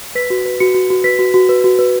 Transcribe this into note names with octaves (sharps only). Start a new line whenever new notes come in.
B4 B6
F#4
B4
F#4 C#7
F#4
F#4
B4 B6
F#4
F#4
B4
F#4
B4